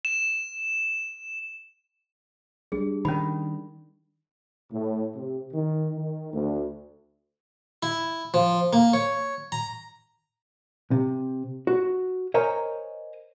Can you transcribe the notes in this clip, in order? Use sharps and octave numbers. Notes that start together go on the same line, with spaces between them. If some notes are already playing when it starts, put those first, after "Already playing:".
E7
G3 D4 G#4
D#3 C#4 B5
A2
C3
D#3
D#3
D2
E4
F3
A#3
C#5
A#5
C3
F#4
A#4 C5 C#5 D#5 G#5 A#5